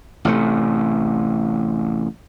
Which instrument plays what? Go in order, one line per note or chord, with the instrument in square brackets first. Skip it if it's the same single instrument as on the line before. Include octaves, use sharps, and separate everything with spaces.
[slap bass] A1 C3 A3